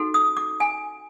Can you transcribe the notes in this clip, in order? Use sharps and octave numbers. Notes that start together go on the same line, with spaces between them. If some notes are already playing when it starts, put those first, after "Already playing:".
Already playing: D#4 F#4 A4
D#6
D6
G#5